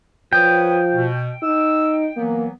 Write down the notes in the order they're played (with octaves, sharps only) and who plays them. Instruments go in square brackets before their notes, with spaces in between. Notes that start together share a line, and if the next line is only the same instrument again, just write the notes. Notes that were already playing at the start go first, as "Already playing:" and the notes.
[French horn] F3 [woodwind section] B4 C#5 D#6 [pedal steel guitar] G5
[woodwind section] B2
[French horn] D#4 [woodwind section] E6
[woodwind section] E3 F#3 B3 [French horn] A#3